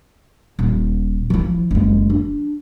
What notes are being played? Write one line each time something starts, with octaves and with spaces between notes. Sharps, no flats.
D#1
F3 E4
F#1 G#3
D4